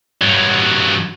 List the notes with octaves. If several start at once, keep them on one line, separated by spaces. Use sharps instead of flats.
G2 F#3